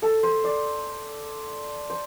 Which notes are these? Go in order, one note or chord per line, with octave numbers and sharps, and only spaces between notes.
A4
C5
D5
C5